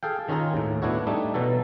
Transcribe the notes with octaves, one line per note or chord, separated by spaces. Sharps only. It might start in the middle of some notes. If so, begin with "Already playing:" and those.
G#4 A4 F5 G5
D#3 C#4 F4 G#4 A#4
D#2 A2
A2 B3 D4 E4 F#4 C#5
G3 A3 D4 D#4
B2 E3 F#3 A4